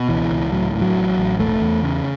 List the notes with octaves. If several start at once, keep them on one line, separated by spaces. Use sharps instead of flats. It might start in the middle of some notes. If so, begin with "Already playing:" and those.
Already playing: B2
C#2 E3
C#2
A2 F#3
A2
F#3
A1
A1
E1 A3
E2
C#3